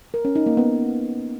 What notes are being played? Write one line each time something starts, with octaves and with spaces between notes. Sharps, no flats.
A#4
C#4
D#4
A#3
B3